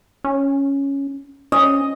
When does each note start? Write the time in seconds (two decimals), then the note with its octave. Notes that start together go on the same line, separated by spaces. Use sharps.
0.24 C#4
1.52 C#4 D#5